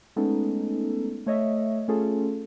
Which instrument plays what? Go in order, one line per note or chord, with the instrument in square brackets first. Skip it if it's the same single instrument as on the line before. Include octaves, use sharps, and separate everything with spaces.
[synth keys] G#3 A3 B3 C#4 D#4 A4
A3 C#5 D#5 E5
A3 C#4 F4 G#4 A4